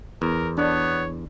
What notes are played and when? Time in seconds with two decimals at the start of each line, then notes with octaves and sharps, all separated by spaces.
0.22 E2 A#4
0.58 B3 D4 C#5